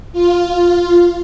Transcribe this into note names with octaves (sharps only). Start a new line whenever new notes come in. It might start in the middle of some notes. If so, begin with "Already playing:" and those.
F4